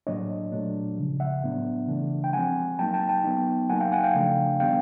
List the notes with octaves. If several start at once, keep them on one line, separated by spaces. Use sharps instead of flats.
A2 F#3 A#3 D4 C#5 D#5
A#2 F#3 A3 D4
C#3 F3 G#3
E5 F#5
A2 F#3 B3 D4
C#3 E3 A3 D4
G5
F3 G#3 C4 F#5 G#5
F#3 A#3 D#4 G5 A5
G5 A5
G5 A5
F#3 B3 D#4
F#3 A#3 D#4 F#5 G#5
F5 G5
F#5 G#5
F5 G5
C#3 F3 A3 D4
D#3 G3 B3 D4 F5 G5